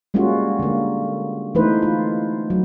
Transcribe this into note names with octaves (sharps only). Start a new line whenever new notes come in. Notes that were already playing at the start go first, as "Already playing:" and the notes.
G3 G#3 A#3 C#4 F4 F#4
D3 A#3
E3 A3 D#4 E4 B4 C5
F4
F#3